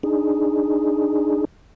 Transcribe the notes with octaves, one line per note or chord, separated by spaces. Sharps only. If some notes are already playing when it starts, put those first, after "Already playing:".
D4 D#4 G#4